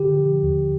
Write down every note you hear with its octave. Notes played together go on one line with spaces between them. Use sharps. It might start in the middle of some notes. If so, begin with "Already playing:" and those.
Already playing: D3 G4
F3
D#2